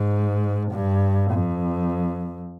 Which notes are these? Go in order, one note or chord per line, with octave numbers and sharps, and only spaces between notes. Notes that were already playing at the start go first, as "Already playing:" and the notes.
Already playing: G#2
G2
F2